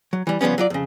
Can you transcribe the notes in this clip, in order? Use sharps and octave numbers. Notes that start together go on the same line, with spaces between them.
F#3
E3 G3
C#2 F3 G3 B3 C#4
F#3 F4 D5
F2 C#3